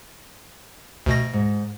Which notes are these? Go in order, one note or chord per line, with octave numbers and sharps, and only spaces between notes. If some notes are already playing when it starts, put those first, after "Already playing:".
D2 B2 A#6
G#2